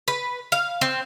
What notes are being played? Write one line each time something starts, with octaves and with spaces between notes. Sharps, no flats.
B4
F5
C4